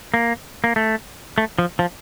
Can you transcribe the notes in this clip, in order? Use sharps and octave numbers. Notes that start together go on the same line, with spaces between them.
A#3
A#3
A3
A3
F3
F3